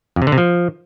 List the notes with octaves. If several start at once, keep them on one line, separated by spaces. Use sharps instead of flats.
F2
C3
D3
C3
F3